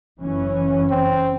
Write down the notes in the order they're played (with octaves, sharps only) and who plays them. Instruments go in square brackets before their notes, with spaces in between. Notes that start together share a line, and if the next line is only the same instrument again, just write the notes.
[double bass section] F#1 E3 C#4
[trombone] C4